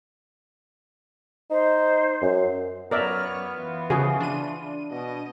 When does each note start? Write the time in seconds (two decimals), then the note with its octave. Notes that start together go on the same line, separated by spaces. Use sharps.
1.51 D#4 C5
2.22 F#2
2.91 F#2 B3 A#4 C#5 D5 E5 F6
3.56 E3 F4
3.90 C#3 F3 F#4 G#4
4.20 D4 D#7
4.91 B2 D#5